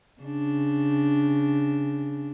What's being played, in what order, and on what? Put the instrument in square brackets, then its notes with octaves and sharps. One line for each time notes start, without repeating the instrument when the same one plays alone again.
[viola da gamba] C#3 D4